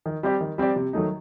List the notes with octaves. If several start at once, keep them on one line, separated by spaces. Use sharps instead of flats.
D#3
G3 C4 G4 D5
D#3
G3 C4 G4 D5
C3
D#3 F#3 A3 D#4